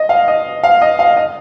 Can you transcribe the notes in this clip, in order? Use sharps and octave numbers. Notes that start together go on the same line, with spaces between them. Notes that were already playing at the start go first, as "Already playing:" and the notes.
Already playing: D#5
F5
D#5
F5
D#5
F5
D#5